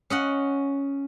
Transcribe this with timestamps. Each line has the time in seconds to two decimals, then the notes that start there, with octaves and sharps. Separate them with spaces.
0.10 C#4 D#5 F#5